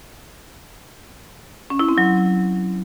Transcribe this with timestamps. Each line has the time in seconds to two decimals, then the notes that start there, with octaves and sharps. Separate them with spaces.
1.70 C#4
1.79 E4
1.89 C4
1.98 F#3